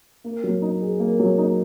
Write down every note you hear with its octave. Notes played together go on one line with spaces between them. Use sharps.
A#3
F#3
D#4
G#4
A#3
F#3
D#4